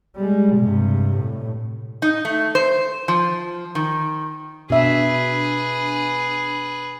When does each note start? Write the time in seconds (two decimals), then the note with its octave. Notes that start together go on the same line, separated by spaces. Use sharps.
0.16 G3 G#3
0.56 G2 C3
1.17 A2
2.02 D#4
2.25 A3
2.55 C5
3.08 F3
3.75 D#3
4.70 B2 D4 G#4 B4 E5